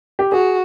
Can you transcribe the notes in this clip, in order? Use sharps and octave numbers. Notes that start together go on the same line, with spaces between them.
G4
F#4 G#4